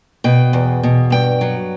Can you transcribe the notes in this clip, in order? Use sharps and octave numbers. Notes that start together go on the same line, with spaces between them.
B2 G5
E2
B2
G2 G5
F#3